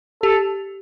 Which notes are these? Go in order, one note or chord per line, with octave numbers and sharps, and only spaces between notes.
G4 A4